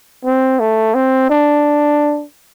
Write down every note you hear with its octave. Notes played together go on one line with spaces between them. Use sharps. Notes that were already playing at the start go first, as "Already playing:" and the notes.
C4
A3
C4
D4